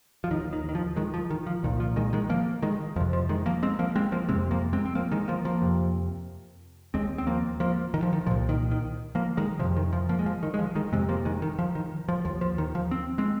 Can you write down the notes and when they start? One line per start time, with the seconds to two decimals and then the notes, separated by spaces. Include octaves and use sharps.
0.24 F3
0.30 D#2 D#3
0.53 D#3
0.69 D#3
0.75 F3
0.96 D#3 G#3
1.14 F3
1.30 D#3
1.47 F3
1.63 C2 A#2 D#3
1.80 F3
1.96 D#3 G#3
2.13 D#3 G#3
2.29 F3 A#3
2.62 D#3 G#3
2.96 F2 F3
3.00 C3
3.13 F3
3.29 D#3 G#3
3.46 F3 A#3
3.63 G#3 C4
3.79 F3 A#3
3.96 G#3 C4
4.12 F3 A#3
4.29 F2 C3 G#3 C4
4.51 F3 A#3
4.73 G#3 C4
4.85 C4
4.95 F3 A#3
5.12 D#3 G#3
5.28 F3 A#3
5.45 F3 A#3
5.61 F2 C3
6.94 D#2 G#3 C4
7.18 C4
7.27 F3 A#3
7.60 F3 A#3
7.94 D#3
8.03 F3
8.13 D#3
8.27 C2 A#2 F3
8.49 D#3
8.71 D#3
9.15 F3 A#3
9.37 D#3 G#3
9.59 C3 F3
9.63 F2
9.76 D#3
9.93 F3
10.09 F3 A#3
10.19 G#3
10.26 F3
10.43 D#3
10.54 G#3
10.59 F3
10.75 D#3 G#3
10.92 F2 C3 G#3 C4
11.09 F3 A#3
11.25 D#3 G#3
11.42 D#3
11.59 F3
11.75 D#3
12.08 F3
12.25 D#2 F3
12.41 F3
12.58 D#3
12.75 F3
12.91 C4
13.18 G#3 C4